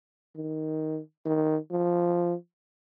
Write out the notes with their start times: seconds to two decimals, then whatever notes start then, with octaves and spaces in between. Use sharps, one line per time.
0.36 D#3
1.26 D#3
1.71 F3